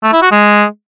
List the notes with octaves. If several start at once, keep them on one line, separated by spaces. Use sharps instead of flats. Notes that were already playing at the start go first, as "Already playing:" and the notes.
A3
E4
F#4
G#3